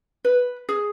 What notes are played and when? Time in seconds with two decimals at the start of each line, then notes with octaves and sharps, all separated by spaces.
0.25 B4
0.69 G#4